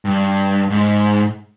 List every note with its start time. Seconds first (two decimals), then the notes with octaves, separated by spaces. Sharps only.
0.05 G2
0.70 G#2